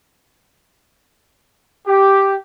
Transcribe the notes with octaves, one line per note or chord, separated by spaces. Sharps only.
G4